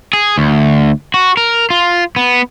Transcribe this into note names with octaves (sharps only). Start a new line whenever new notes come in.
G#4
D2
F#4
A#4
F4
B3